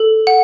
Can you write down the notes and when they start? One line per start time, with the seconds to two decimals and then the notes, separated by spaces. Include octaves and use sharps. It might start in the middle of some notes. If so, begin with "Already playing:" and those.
Already playing: A4
0.27 F#5